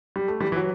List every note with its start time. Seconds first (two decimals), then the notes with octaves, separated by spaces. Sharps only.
0.16 G3
0.28 A3
0.41 E3 G3
0.52 E3
0.56 F#3